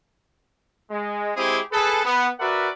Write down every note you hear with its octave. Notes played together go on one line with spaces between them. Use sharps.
G#3
G#3 C4 E4 G4 G#4
G#4 A4 B4
B3
F#4 A#4 B4 D5 E5 F#5